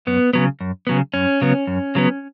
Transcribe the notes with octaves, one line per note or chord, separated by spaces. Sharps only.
F#2 B3
C#3 F#3 B3
F#2
C#3 F#3 B3
F#2 C#4
C#3 F#3 B3
F#2
C#3 F#3 B3